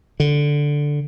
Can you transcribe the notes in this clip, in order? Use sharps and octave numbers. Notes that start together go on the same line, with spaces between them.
D3